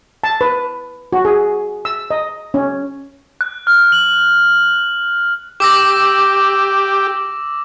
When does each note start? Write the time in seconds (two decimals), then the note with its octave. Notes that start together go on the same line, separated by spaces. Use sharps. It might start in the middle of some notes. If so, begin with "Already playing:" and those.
0.24 A5
0.41 B4
1.13 F#4
1.25 G#4
1.85 E6
2.11 D#5
2.54 C#4
3.41 F#6
3.67 F6
3.92 F#7
5.60 G4 D6 E6 A#6